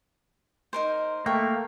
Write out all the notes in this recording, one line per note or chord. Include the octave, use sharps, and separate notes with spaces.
D#4 A#4 C5
A3 A#3 G5 C#6